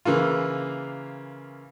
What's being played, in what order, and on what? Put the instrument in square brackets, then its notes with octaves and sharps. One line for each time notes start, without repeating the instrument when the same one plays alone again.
[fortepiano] C#3 E3 A#3 F4